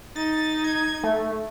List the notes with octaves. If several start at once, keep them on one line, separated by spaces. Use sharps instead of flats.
D#4 A6
G#6
A3